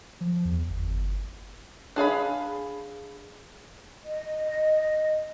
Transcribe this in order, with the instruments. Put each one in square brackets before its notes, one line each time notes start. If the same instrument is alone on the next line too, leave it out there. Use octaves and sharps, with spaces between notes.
[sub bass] F3
E2
G1
[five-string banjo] D4 G#4 F5 B5
[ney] D#5